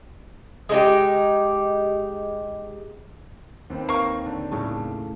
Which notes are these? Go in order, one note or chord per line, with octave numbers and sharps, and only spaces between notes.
G#3 D#4 G4
D#2 C4 B4
A#3 A#4 C#6
D3
A2 C#3 A3